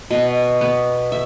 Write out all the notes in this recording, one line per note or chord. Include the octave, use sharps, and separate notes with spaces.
B2
B3
E5